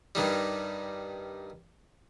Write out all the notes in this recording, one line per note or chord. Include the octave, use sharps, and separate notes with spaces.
G2 D#3 G3